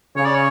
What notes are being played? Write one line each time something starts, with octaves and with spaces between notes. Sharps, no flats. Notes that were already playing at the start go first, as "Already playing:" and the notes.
C#3 C#5
D5
C#5